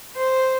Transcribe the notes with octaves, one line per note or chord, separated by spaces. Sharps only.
C5